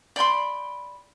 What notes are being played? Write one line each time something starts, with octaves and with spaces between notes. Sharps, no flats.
D5 G5 B5 C6